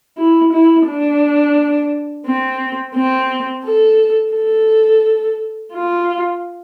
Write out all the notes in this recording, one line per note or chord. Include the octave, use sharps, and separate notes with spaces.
E4
E4
D4
C4
C4
A4
A4
F4